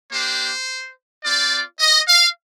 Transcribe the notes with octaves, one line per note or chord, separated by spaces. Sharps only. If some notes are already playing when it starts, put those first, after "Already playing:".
A#3 D4 G4 C5
C4 F4 D5
D#5
F5